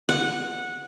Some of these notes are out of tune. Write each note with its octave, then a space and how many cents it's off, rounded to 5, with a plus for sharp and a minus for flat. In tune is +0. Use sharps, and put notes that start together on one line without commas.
F#5 -15